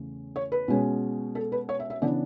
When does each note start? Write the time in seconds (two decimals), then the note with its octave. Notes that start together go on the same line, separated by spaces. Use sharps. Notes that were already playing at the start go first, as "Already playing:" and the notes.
Already playing: E2 C#3 A3
0.36 C#5
0.52 B4
0.68 B2 G#3 C#4
1.35 A4
1.52 B4
1.69 C#5
1.80 E5
1.90 E5
2.02 C#3 E3 B3 D4 D5